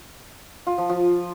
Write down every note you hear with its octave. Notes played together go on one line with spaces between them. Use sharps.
F4
F3
F3